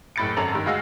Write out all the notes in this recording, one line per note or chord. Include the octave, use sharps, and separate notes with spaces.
F#1 A2 B5 A6 C#7 D7
G#1 F#2 C#4 A4 A#5 F#7
G2 D#3 E6
D2 G#3 F#4 F5 E6 A#6